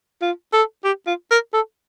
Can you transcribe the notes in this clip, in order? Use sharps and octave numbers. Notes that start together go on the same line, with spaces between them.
F4
A4
G4
F4
A#4
A4